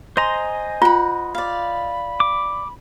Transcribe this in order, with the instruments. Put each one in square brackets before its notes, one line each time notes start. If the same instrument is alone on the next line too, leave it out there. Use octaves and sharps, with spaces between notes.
[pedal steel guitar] C5 D#5 A#5 [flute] G#5 [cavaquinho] C6
[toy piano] F4 [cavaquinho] F#5 B5
[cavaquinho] D5 F5 [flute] B5
[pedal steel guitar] D6